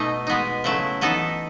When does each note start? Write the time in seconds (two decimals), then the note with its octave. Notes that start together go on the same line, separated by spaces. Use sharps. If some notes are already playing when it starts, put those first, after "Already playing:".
Already playing: B2 A3 D#4
0.27 G#3 B3 D#4
0.64 C#3 F#3 A3 E4
1.01 E3 B3 D#4 A4